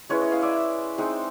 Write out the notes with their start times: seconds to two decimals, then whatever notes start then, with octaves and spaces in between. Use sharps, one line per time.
0.09 G#3 C#4 E4 B4 C#5
0.21 C#5 D#5
0.32 D#5 F5
0.42 D5 E5
0.98 G#3 C4 D#4